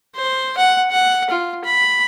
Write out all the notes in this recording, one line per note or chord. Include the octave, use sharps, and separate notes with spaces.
C5
F#5
F#5
F4
B5